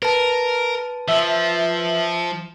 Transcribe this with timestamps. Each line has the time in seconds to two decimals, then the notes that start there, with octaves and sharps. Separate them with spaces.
0.02 A#4 B4 A5
1.08 F3 E5